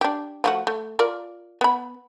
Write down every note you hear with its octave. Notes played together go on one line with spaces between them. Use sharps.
D4 G4
F3 A3 F#4
A3
F4 A#4 D5
B3 B5